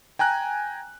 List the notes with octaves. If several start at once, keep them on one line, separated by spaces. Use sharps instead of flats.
G5 G#5 A#5 F#6